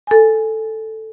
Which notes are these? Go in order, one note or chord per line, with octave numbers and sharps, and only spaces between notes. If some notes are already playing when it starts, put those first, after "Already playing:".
A4 G#5